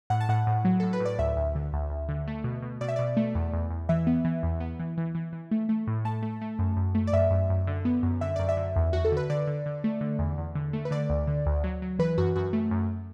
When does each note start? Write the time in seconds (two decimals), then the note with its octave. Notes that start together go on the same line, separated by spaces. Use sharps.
0.10 A2 F#5
0.20 A5
0.29 A2 F#5
0.47 A2
0.65 F#3
0.80 A2 A4
0.93 B4
1.00 A2 D5
1.19 D2 E5
1.37 D2
1.55 D3
1.73 D2
1.90 D2
2.09 D3
2.27 A3
2.44 B2
2.62 B2
2.81 B2 D5
2.88 E5
2.96 B2 D5
3.17 A3
3.35 E2
3.53 E2
3.70 E2
3.89 E3 E5
4.07 B3
4.25 E3
4.43 E2
4.60 B3
4.80 E3
4.98 E3
5.15 E3
5.33 E3
5.51 A3
5.69 A3
5.87 A2
6.05 A3 A5
6.22 A3
6.41 A3
6.59 F#2
6.77 F#2
6.95 A3
7.07 D5
7.13 F#2 E5
7.31 F#2
7.50 F#2
7.67 D3
7.85 B3
8.03 F#2
8.21 D3 E5
8.36 F#2 D5
8.49 E5
8.57 D3
8.76 E2
8.93 E2 F#4
9.05 A4
9.12 D3 B4
9.30 D3 D5
9.47 D3
9.66 D3
9.84 A3
10.01 D3
10.19 E2
10.38 E2
10.55 D3
10.73 A3
10.85 B4
10.91 D3 D5
11.10 D2
11.27 D3
11.46 D2
11.64 F#3
11.82 F#3
11.99 E3 B4
12.18 F#2 F#4
12.36 F#2 F#4
12.53 A3
12.71 F#2